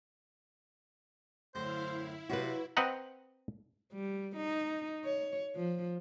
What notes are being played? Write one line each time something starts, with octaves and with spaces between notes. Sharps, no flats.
F#2 A2 D3 E4 C5 F5
E4
C3 F#3 F4 F#4 B4
C4 B4 D#5 F#5 A#5
G3
D#4
C#5
F3